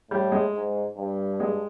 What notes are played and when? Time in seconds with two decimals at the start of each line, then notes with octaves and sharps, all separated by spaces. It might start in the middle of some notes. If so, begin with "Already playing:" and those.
0.11 A2 G3
0.32 G#3
0.55 G#2
0.97 G2
1.40 G#3